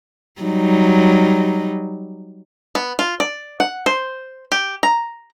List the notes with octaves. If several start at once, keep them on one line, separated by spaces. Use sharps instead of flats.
F#3 G3 D#4
B3
F4
D5
F#5
C5
G4
A#5